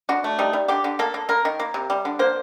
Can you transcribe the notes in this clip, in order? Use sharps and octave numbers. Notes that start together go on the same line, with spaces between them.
D3 F#4
A3
G3 D#4
G3
D3 G4
D3
A#3 A4
A#3
A#3 A#4
D#3
A#3
C3
G3
D3
A#3 C5